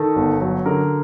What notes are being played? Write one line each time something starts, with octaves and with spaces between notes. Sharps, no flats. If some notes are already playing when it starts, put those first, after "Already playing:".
Already playing: D#3 A4
G1
F#3
D3 A#4